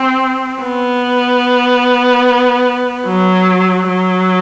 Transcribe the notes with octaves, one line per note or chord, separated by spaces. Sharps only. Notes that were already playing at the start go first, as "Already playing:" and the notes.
Already playing: C4
B3
F#3
F#3